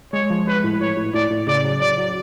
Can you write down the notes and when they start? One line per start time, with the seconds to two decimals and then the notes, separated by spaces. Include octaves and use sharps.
0.13 G#3 C#5
0.30 F3
0.47 G#3 B4
0.64 A2
0.80 A2 C#5
0.97 A2
1.14 A2 D5
1.30 A2
1.47 C#3 D5
1.64 F#3
1.80 F#3 D5
1.98 F#3